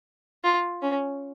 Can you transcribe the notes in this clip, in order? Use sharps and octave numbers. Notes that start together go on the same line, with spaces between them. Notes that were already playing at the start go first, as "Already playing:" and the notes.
F4
C#4